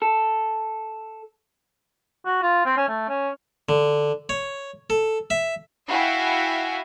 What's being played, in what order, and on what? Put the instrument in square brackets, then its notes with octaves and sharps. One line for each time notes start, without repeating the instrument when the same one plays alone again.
[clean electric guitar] A4
[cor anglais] F#4
F4
C4
C#4
A3
C#4
[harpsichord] D3
C#5
A4
E5
[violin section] E4 F#4 E5 F5 G5 G#5